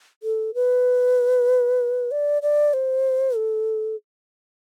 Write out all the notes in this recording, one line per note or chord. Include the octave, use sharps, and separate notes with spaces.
A4
B4
D5
D5
C5
A4